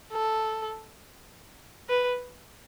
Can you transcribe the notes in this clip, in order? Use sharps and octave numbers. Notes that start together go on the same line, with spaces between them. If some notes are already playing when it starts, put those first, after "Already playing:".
A4
B4